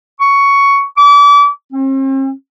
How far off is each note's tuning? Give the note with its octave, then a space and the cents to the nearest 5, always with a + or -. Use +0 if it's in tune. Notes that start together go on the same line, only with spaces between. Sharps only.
C#6 +10
D6 -35
C4 +45